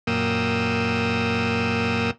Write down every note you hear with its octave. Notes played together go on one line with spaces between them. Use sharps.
F#2 A#2 A#3 G5 D#6 E6